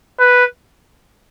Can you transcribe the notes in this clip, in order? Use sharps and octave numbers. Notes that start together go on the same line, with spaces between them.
B4